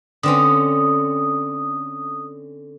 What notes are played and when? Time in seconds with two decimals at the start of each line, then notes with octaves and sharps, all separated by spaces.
0.23 D3 C4 C#4 D#6